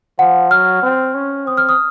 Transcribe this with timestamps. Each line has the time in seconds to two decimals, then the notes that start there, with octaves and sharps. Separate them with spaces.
0.19 F3 F#5
0.51 F#3 F6
0.82 C4
1.14 C#4
1.47 C4 D#6
1.57 F6
1.69 D#6